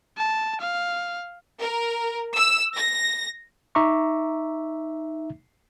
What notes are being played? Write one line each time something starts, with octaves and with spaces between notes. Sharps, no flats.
A5
F5
A#4
E6
A#6
D#4 E5 A#5 C#6 D6